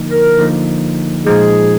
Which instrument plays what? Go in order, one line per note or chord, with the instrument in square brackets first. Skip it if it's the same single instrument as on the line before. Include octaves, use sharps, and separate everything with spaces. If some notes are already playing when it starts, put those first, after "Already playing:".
Already playing: [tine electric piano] D3 F3 A#3 D#4
[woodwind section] A#4
[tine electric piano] D3 F3 A#3 D#4
[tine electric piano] A#2 F3 G#3 D#4 [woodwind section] G#4